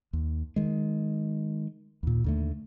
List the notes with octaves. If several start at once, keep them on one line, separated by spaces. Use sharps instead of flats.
D#2
D#3 G#3
D#2 A#2
D#2 D3 A3